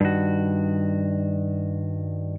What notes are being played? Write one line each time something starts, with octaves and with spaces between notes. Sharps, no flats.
G2 D#3 F#4